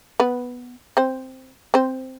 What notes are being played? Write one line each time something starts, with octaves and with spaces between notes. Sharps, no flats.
B3 B4
C4 C5
C4 C5